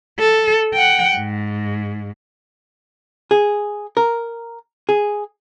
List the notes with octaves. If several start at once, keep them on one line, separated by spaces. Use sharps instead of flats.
A4
F#5 G5
G#2
G#4
A#4
G#4